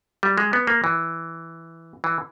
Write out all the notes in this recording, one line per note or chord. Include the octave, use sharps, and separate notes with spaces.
G3
G#3
B3
A#3
E3
E3